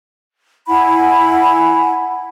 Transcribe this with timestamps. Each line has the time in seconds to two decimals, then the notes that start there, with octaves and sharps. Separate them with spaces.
0.67 E4 F#5 G#5 B5